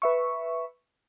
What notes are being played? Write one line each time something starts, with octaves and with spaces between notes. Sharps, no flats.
B4 E5 C#6